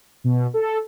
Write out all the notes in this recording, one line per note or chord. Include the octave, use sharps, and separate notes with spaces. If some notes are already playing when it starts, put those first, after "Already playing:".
B2
A4